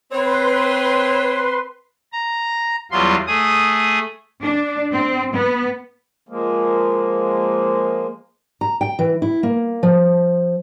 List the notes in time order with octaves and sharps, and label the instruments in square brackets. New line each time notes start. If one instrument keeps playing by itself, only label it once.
[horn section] C4 [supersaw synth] B4 C6 [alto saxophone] C#5
[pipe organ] A#5
E2 F#3 G3 F4 C6
A3 G#4 D#6
[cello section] D4
C4
B3
[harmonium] F3 G#3 A#3
[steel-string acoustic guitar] A#5
G5
E3
E4
A#3
F3